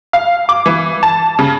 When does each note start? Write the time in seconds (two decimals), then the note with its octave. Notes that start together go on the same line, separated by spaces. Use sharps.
0.13 F5
0.49 D6
0.66 E3
1.03 A5
1.39 C#3